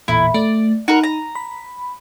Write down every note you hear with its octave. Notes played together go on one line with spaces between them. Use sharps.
A1 E2 A#2 E4
A3 D5
D#4 F#4 A#4
A#5
B5